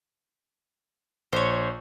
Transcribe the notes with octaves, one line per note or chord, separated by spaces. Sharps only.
A#1 C5 C#5